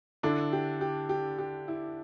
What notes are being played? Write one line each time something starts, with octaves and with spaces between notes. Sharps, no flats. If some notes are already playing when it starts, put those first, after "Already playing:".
D3 D4 E4
G4
G4
G4
G4
E4